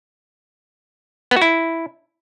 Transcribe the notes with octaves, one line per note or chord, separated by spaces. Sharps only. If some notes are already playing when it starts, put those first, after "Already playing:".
B3
F#4
E4